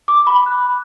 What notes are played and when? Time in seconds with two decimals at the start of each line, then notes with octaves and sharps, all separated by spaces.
0.08 D6
0.27 B5
0.46 F#6